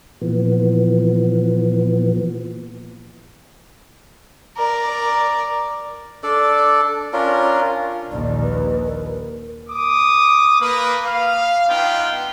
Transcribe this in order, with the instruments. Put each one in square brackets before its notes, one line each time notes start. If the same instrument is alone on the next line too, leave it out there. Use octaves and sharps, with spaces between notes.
[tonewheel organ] A#2 E3 F3 B3
[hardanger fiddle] A#4 D5
[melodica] D4 A4 D5
C#4 D4 F4 A#4
[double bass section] A#1 D#2 [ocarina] D5
[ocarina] B4
A#4
[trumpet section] D6 D#6
A#3 B4
F5
B3 D4 D#4 F4 F5 G5